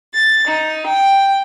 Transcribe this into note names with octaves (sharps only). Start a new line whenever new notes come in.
A6
D#4
G5